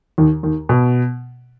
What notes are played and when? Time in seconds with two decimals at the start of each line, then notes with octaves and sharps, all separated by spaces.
0.18 D#2 D#3
0.43 D#2 D#3
0.69 B2